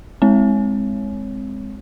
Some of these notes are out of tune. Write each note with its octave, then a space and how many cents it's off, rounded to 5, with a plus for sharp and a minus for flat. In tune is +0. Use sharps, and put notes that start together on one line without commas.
G#3 +0 C4 +0 C#5 +0